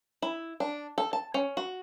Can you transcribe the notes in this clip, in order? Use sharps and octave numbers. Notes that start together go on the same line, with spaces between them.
E4
D4
A4
A5
C#4
F#4